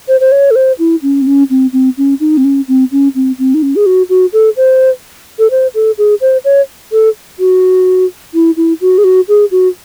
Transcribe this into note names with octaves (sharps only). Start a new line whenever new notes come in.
C5
C5
C#5
A4
C5
E4
C#4
C4
C#4
C4
C4
C#4
D#4
C4
C#4
C4
C#4
C4
C4
D#4
C#4
G#4
F#4
F#4
A4
C5
A4
C5
A4
G#4
C5
C#5
A4
F#4
E4
E4
F#4
G#4
F#4
G#4
F#4